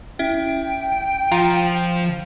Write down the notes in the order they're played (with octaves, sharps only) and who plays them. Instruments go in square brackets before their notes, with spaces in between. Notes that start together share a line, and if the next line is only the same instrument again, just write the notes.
[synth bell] C#4 E4 E5 [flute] G5
[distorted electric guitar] F3 [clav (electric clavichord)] F4 A#5